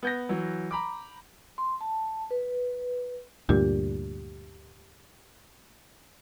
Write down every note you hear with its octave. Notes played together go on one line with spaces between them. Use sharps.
B3 G6 A#6
E3 F#3
A#5 B5 D6
C6
A5
B4
D2 G2 A#2 G4